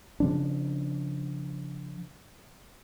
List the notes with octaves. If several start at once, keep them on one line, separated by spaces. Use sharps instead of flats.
C#3 F3 D4